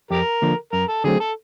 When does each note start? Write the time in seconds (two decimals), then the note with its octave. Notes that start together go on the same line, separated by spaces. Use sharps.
0.11 F2 G4 A#4
0.42 D3 F3 A#3
0.72 F#2 A#4
0.88 A4
1.04 D3 F#3 A3 C4 G#4
1.20 A4